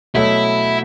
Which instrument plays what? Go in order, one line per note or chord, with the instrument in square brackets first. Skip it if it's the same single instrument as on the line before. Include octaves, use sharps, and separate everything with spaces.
[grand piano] B2 F#3 A3 [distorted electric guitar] E4